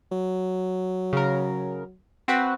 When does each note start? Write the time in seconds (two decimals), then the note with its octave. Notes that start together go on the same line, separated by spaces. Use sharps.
0.12 F#3
1.13 C#3 A#4
2.28 C4 F#4 B4